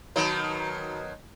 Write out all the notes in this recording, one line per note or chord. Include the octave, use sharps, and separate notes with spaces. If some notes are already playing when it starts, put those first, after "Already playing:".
B2 D#3 F#3